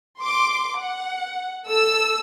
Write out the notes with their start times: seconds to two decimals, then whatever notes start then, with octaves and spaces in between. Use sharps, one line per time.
0.21 C6 D6
0.77 F#5
1.67 A4 E6